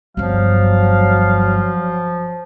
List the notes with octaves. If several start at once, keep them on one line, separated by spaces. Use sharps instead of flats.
G1 G2 F3 F#3 F5